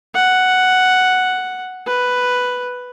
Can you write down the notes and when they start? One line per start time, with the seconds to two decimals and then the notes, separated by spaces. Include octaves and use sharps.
0.15 F#5
1.87 B4